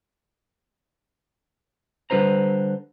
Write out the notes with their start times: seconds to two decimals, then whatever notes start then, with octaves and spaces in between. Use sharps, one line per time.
2.10 D3 G3 E4 B4 C5 A#5